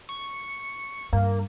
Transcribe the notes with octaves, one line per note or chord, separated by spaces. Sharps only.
C#6
G2 A#3